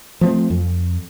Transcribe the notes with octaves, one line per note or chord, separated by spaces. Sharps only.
F3 A3 C4
F2